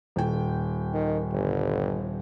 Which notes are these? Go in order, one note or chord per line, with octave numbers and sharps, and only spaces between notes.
D#1 G5
D#3
G1